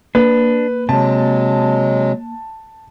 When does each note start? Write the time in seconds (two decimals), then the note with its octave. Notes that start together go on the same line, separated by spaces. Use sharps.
0.15 A#3 D4 B4
0.89 C3 F#3 G#3 A5